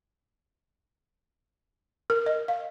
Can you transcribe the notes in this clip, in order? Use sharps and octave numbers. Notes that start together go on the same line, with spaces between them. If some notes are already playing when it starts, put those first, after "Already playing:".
A#4
D#5
F5